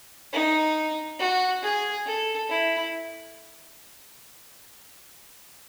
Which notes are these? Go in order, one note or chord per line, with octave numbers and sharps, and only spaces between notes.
D#4
F#4
G#4
A4
E4